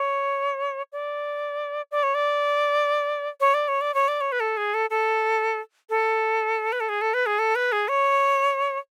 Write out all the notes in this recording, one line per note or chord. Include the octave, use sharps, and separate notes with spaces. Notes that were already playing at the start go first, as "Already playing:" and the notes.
Already playing: C#5
D5
D5
C#5
D5
C#5
D5
C#5
D5
C#5
D5
C#5
B4
A4
G#4
A4
A4
A4
B4
A4
G#4
A4
B4
G#4
A4
B4
G#4
C#5